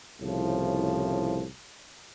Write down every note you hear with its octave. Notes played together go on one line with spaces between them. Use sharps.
C2 A2 C#3 F3